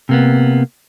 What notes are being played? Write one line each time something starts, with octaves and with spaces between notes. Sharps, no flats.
C3 A#3 B3